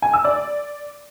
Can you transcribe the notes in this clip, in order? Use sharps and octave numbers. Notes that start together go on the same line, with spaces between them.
G#5
E6
D5